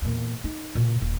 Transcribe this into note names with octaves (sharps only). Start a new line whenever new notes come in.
E2 A#2
D#4
A#2 C#3
D#1